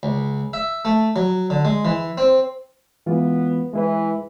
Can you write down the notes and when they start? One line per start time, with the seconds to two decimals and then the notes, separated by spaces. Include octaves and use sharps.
0.03 C#2
0.53 E5
0.85 A3
1.16 F#3
1.50 D3
1.65 G#3
1.85 E3
2.18 C4
3.06 E3 G#3 B3 F4
3.73 E3 G#3 E4 B4